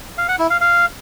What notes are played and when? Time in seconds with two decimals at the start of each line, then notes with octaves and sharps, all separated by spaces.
0.18 F5
0.28 F#5
0.39 E4
0.50 F5
0.61 F5